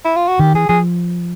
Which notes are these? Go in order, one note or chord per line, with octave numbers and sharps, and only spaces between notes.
E4
F4
F#4
D#3 G4
E3 G#4
F3 G#4